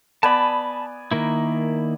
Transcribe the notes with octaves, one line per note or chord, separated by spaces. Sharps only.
B3 D5 G#5 A5 B5
D#3 A#3 E4